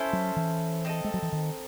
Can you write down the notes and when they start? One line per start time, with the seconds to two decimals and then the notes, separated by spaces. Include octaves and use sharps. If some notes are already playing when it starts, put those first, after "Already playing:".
Already playing: C#4 E4 A4 C5
0.13 F#3
0.36 E3
0.85 C4 D#4 A4
1.04 G#3
1.14 F#3
1.22 E3
1.32 D#3